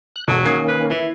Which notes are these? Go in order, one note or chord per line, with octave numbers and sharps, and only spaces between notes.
F#6
E1 F#3 F#4 A4
D#3 A#3 C#4 D#6 G#6 C7
B4
E3 E4